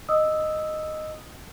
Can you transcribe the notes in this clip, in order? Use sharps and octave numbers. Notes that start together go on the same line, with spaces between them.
D#5 D#6 E6